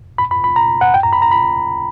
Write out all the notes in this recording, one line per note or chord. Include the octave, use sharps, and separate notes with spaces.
B5
B5
B5
A#5
F#5
G5
A#5
B5
A#5
B5